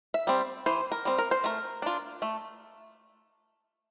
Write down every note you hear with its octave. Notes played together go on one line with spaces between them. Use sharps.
E5
G3 C4
E3 C5
A#4
G3 C4
A#4
C5
A3 A#4
D4 F4
A3